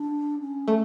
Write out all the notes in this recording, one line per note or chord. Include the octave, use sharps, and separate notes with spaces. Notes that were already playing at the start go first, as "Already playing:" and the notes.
Already playing: D4
C#4
A3